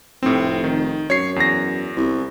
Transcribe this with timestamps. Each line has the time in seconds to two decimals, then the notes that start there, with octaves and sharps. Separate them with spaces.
0.23 F1 A2 C4
0.64 D#3
1.10 F#2 C#5 C7
1.36 E2 A#6
1.97 C2